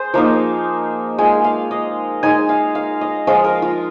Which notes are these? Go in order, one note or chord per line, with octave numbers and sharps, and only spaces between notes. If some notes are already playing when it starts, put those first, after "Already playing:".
Already playing: G#4 C5
F3 A#3 D#4 F5
G#3 F4 G#5
F5
D#5
G#3 D#4 G#5
F5
F5
D#5
F3 G#3 F4 F5
A#4
F4